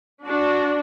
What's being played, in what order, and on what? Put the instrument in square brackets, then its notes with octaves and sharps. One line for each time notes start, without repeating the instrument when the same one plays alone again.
[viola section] D4 F#4